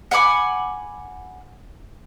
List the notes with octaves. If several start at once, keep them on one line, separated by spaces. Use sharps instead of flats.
F#5 G#5 B5 D6